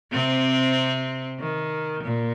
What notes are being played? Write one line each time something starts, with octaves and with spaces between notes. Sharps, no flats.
C3 C4
D#3
A#2